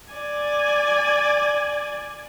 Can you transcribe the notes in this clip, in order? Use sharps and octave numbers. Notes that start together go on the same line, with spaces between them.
D5 G#5